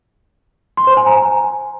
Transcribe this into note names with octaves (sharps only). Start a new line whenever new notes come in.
C6
C5
G#5
A#5
G#5